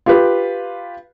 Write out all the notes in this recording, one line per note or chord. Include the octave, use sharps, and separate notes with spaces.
F4 G4 B4